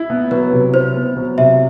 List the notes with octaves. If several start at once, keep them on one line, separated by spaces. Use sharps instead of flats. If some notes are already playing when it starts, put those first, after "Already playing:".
Already playing: E4
B3
F#3 B4
C3
E4 C5
B3
F#3
C3 E5